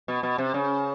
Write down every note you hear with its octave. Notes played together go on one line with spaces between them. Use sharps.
B2
B2
C3
C#3